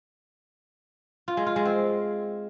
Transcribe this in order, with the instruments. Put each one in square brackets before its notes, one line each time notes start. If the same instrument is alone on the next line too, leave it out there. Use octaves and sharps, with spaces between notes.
[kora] F4
G#3
F4
G#3
C4